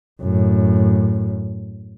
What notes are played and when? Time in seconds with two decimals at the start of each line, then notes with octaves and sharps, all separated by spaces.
0.23 F#2 A2